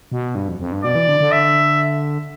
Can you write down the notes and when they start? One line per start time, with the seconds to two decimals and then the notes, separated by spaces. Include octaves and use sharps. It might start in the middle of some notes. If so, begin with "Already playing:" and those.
0.12 B2
0.35 G2
0.48 F2
0.59 F2
0.72 G2
0.84 B2 D5
0.95 E3
1.09 D3
1.20 D3
1.32 E5